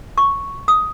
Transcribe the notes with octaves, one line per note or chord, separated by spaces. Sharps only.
C#6
D#6